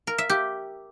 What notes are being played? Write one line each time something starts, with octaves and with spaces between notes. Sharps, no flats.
A#4
E5
G4